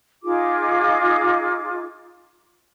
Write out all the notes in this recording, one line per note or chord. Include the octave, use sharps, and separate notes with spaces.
D#4 F4 G#4 D6